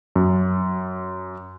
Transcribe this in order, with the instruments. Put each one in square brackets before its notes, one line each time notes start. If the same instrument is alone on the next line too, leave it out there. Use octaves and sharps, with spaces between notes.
[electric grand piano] F#2